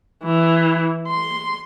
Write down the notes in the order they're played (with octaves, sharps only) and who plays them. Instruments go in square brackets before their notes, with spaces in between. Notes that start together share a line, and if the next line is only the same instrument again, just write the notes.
[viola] E3
C6